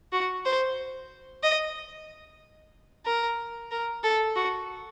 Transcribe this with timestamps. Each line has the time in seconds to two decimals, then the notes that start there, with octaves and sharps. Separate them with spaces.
0.13 F#4
0.45 C5
1.43 D#5
3.06 A#4
3.71 A#4
4.03 A4
4.36 F#4